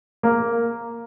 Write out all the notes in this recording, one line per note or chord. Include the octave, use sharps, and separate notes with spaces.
A#3